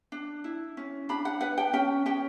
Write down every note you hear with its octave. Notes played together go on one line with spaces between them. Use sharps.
D4
E4
C#4
D4 B5
F#5
B4 F#5
G5
C#4 G5
C#4 G5